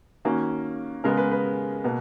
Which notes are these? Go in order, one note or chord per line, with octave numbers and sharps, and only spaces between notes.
D#3 A#3 C#4 F#4
C#3 G#3 B3 A#4
B4
B4
B2 A#3